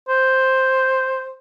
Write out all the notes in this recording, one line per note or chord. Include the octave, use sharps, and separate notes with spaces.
C5